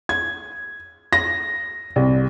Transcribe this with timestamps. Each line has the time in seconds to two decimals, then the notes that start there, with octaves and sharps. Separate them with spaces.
0.09 G#6
1.13 A#6
1.96 C2